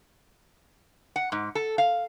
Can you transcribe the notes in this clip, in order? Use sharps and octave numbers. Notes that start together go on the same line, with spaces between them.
F#5
G#2
A4
F5